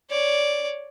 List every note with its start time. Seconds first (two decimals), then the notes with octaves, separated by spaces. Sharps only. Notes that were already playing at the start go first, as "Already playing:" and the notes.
0.11 C#5 D5